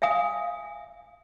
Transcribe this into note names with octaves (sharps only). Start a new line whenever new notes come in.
E5 F5 G#5 D#6